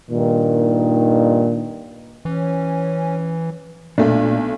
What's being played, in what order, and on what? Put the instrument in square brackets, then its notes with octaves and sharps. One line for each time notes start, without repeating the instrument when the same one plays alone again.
[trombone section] G2 A#2 D#3
[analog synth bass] E3 [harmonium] C#4
[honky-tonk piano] B1 A3 [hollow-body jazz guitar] A#2 D4